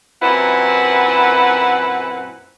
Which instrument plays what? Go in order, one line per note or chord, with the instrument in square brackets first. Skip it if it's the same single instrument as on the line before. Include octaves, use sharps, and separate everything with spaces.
[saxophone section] F#2 A#2 C4 E4 B4 F#5